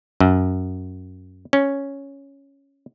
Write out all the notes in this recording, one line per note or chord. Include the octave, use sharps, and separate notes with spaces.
F#2
C#4